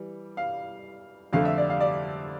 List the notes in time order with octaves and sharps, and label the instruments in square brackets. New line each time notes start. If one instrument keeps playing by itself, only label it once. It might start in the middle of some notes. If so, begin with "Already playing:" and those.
Already playing: [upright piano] E3 G3
F5
F2 D3 A3 F5
E5
D5
F5
D5